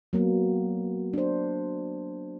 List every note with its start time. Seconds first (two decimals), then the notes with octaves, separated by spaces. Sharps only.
0.13 F#3 A#3 B3
1.13 D4 C5